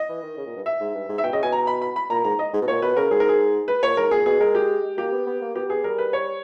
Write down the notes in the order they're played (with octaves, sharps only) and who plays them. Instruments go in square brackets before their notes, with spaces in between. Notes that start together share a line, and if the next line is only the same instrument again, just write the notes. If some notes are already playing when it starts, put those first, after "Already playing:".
Already playing: [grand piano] D#5
[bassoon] E3
D#3
C#3
A#2
G2
[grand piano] E5
[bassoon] G#2
G2
G#2
[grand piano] E5
[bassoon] B2 [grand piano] G5
[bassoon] C#3 [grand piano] D#5
[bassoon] B2 [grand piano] G#5
[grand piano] A#5
B5
B5
B5
[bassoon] A#2 [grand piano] A#5
[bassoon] G#2 [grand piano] A#5
[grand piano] D#5
[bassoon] G#2
B2
[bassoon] A#2 [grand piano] C#5
[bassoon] B2 [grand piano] B4
[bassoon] C#3 [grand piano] A#4
[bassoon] G#2 [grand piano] G#4
[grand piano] A#4
G#4
B4
[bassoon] A#2 [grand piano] C#5
[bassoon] G#2 [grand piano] A#4
[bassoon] A#2 [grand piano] G#4
[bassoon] B2 [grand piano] G#4
[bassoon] G#3 [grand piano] A#4
[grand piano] G4
[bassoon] A#3 [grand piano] G4
[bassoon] B3
B3
A#3
[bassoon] B3 [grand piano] G4
[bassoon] B3 [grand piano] G#4
[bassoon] G3 [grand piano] A#4
[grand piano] B4
C#5